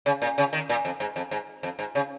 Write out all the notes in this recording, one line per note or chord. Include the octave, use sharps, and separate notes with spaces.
C#3
A#2
C#3
D#3
A#2
F2
G#2
F2
G#2
F2
G#2
C#3